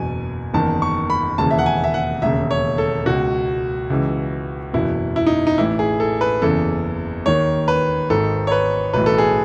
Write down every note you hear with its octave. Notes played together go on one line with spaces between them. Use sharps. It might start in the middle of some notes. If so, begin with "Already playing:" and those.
Already playing: F#1 E2 B2 G#5
F#1 E2 D#3 A5
C#6
B5
E1 D#2 C#3 E3 A5
E5
F#5
G#5
E5
F#5
E1 D#2 C#3 E5
C#5
A4
C#2 B2 F#4
C#2 C#3 E3
F#1 E2 B2 E4
E4
D#4
D#4
A1 A2 E3 E4
G#4
A4
B4
F#1 E2 C#3 E3 A4
D#2 D#3 C#5
B4
G#1 G#2 D#3 A4
C#5
B4
B1 A2 E3 B4
A4
G#4